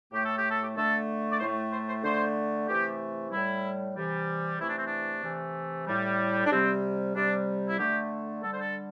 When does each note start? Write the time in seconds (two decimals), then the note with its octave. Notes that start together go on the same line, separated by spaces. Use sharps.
0.13 A2 A3 G4
0.25 A4
0.37 G4
0.50 A4
0.63 G4
0.77 D3 A3 A4
1.32 D5
1.40 A2 A3 C5
1.72 C5
1.89 C5
2.04 D3 A3 C5
2.68 C3 E3 A3 G4
3.32 A2 G3 E4
3.96 C3 E3 G3
4.59 C3 E3 A3 E4
4.69 D4
4.78 C4
4.86 D4
5.24 C3 E3 A3
5.87 A2 G3
6.46 D4
6.51 C3 G3 C4
7.15 C3 G3 D4
7.69 E4
7.79 D3 A3 G4
8.43 D3 G3 A4
8.52 C5
8.60 A4